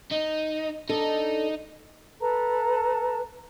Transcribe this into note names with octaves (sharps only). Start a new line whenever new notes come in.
D#4
D4 D#4 A4
A4 B4 A5 A#5